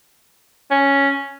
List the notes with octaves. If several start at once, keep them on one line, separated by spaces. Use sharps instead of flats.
C#4